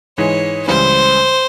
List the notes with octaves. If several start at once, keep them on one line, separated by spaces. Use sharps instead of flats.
G#2 E3 G#3 C#5
C#2 C#3 E3 G3 C5